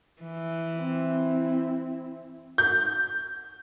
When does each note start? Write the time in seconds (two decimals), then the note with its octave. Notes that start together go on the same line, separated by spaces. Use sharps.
0.22 E3
0.76 C4 E4
2.58 G6